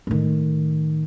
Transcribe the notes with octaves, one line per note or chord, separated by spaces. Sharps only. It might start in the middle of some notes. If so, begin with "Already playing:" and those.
A2 D#3